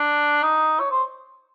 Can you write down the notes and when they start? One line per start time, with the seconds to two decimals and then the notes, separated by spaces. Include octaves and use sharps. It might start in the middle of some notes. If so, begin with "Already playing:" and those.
Already playing: D4
0.43 D#4
0.80 C#5
0.91 C5